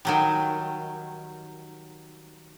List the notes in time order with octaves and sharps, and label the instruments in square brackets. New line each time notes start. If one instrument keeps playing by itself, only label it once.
[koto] D#3 F#3 G3